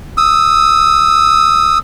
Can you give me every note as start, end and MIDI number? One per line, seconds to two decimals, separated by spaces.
0.17 1.78 87
0.17 1.78 88